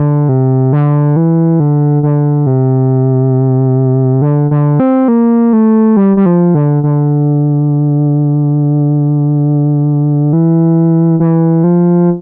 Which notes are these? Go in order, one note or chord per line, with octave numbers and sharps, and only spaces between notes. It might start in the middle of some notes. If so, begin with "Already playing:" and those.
Already playing: D3
C3
D3
E3
D3
D3
C3
D3
D3
C4
A#3
A3
G3
G3
F3
D3
D3
E3
E3
F3